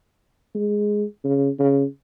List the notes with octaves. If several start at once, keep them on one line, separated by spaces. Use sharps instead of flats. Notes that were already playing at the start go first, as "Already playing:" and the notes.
G#3
C#3
C#3